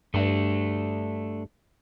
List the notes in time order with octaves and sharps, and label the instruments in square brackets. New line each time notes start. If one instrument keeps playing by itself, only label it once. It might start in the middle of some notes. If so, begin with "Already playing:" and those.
[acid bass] G2 [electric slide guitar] A3 D4